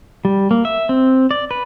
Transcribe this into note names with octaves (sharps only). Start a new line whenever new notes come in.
G3
A#3
E5
C4
D5
B4